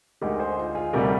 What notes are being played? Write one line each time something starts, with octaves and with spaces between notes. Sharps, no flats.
D2 D3 G#3 D#4 G4 A#4
G#4 C5
F4
F4 G#4
D2 C3 G3 G4 A#4